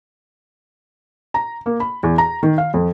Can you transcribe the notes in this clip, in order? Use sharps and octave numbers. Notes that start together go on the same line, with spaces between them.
A#5
A#3
B5
E2
A#5
D#3
F5
F2